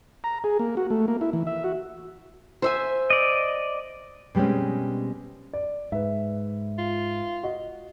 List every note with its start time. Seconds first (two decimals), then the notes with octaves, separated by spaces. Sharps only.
0.24 A#5
0.44 G#4
0.59 A#3
0.77 F#4
0.90 A3
1.08 A#3
1.21 E4
1.33 E3
1.47 E5
1.64 F#4
2.62 C5 E5 G#5
3.10 D5 D#5
4.35 B2 G3 G#3 C4 C#4
5.53 D5
5.92 G#2 B4 E5
6.78 F4
7.43 F#4 D#5